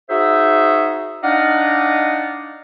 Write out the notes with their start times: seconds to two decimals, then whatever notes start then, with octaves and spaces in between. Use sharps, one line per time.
0.10 D#4 F#4 G#4 C5 E5
1.24 D4 D#4 D5 D#5 F5 F#5